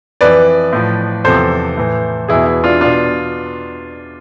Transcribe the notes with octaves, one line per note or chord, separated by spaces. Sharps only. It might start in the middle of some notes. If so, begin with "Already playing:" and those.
F2 E3 B4 D5
A2 F3
E2 C3 F3 A4 C5
A2 E3
E2 B2 E4 G#4
E4
D4 F4
B2 D4 F4